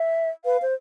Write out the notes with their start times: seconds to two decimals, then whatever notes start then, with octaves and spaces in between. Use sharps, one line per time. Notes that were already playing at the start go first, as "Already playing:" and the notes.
Already playing: E5
0.45 B4 F5
0.62 C5